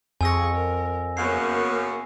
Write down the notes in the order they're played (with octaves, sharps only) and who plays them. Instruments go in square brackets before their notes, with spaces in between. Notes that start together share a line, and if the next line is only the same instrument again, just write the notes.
[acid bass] F2 [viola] G#4 C#6 [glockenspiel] G#5 E6 A#6
[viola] A#4
[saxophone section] F#2 C#3 [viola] A#3 B3 [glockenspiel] C7